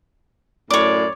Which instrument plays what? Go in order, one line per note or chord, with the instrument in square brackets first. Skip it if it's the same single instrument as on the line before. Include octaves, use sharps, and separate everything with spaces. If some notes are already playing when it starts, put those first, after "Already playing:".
[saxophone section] F#2 A2 D5 [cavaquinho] C#5 D6